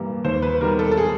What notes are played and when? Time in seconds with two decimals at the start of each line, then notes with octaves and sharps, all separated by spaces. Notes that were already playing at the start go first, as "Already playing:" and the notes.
Already playing: G2 E3 G3 A#3
0.24 D#2 C5
0.42 B4
0.60 D#3 G3 B3 A#4
0.79 A4
0.91 A4
0.97 G#4